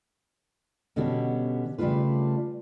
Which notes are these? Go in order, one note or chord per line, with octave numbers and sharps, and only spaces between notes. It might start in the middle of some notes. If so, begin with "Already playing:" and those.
B2 D3 G3 B3 C#4 F#4
C#3 G3 A3 D4 F4 B4